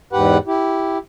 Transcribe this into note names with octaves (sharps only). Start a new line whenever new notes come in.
E2 G#2 G4 B4 F#5
E4 G4